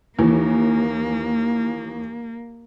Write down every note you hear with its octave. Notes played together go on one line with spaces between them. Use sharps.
D#2 E3 A#3